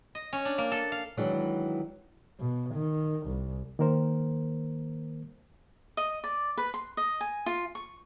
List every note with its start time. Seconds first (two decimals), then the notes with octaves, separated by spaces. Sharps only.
0.15 D#5
0.33 C#4
0.45 D4
0.58 A#3
0.72 A4
0.92 F5
1.17 D#3 E3 F#3 G#3 D4
2.40 B2
2.75 D#3
3.27 C2
3.79 D#3 A#3 A#4 C5
5.97 D#5
6.24 D5
6.58 B4
6.74 C6
6.97 D#5
7.21 G#5
7.46 F4
7.75 C#6